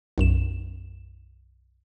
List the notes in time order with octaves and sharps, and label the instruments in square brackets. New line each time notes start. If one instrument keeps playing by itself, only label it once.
[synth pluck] B1 F#2 E7